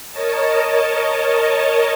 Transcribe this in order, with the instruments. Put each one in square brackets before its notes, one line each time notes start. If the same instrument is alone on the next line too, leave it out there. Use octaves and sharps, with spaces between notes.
[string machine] A#4 C#5 D#5 A5